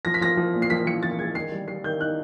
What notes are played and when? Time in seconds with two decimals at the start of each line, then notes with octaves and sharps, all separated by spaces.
0.05 F3 A#6
0.14 B6
0.21 F3 A#6
0.37 F3
0.54 A#2
0.62 C7
0.70 F3 B6
0.86 F3 C#7
1.03 F3 A6
1.19 G#3 G#6
1.35 D#3 C7
1.52 G3
1.68 G3 C7
1.84 D#3 G6
2.00 D#4 F#6